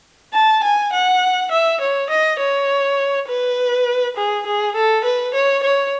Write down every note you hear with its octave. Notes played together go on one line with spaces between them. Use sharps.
A5
G#5
F#5
E5
C#5
D#5
C#5
B4
G#4
G#4
A4
B4
C#5
C#5